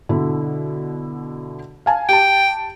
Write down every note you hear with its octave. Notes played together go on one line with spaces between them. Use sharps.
B2 D3 E4
F5 G#5 A5
G4 G5 A5